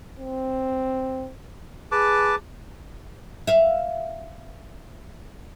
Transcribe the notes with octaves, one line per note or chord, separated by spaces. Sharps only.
C4
G#4 B4 A5 D6
E5 F5